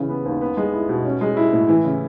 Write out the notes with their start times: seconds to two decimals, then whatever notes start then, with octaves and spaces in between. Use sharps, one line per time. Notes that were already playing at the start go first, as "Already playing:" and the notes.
Already playing: C#3 E3
0.09 B3
0.25 D#2
0.41 B3
0.57 G#3
0.74 E4
0.89 B2
1.05 C#4
1.21 G#3
1.37 E4
1.53 A2
1.69 E3
1.85 C#3